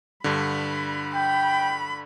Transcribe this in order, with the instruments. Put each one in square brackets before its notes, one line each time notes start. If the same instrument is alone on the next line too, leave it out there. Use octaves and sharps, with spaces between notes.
[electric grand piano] G2 D3 [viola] B5
[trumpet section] G5 [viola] B5